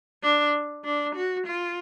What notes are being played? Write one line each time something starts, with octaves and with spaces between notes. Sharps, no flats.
D4
D4
F#4
F4